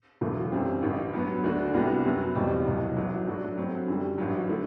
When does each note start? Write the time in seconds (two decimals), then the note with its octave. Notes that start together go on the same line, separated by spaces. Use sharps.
0.21 E1 E2 D3 F#3 A3
0.52 F#2 E3 G3 C4
0.82 A1 G2 D3
1.13 G2 F#3 B3
1.43 D2 D3 A3 D4 F#4
1.74 C2 C3 G3 B3 F#4
2.05 F#2 F#3 B3 F#4
2.35 E1 E2 B2 G3 C4
2.65 C2 B2 F#3
2.96 A1 A2 F#3
3.27 G2 F#3 A3 D4 F#4
3.57 G2 F#3 A3 C4
3.88 F#2 D3 G3
4.18 A1 G2 F#3
4.49 D3 A3